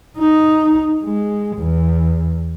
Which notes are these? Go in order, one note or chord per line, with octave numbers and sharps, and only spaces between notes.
D#4
G#3
E2